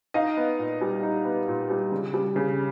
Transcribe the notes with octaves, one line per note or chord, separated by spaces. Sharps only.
D#4 D#5 F5
B3
A#2
G3
D#4
B3
A#2
G3
C#3
G3
C#3